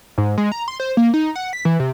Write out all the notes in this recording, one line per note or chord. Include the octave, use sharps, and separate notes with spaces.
G#2
G#3
A#5
C6
C5
A#3
D#4
F#5
B6
E3
C3